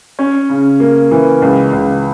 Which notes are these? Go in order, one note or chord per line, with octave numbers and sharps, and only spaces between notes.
C#4
C#3
A#3
E3
C#2
C#2